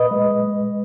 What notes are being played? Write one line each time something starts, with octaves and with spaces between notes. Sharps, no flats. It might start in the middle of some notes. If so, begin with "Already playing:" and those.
Already playing: A#2 B4 D#5
G#3
G#3